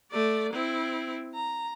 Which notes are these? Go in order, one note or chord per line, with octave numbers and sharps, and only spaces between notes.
A3 D5
C4 E4
A#5